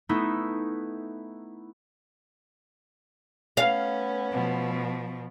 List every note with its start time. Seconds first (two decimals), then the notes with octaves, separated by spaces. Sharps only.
0.09 A3 B3 D#4 E4
3.57 A3 B3 C#4 F5
4.32 B2 F3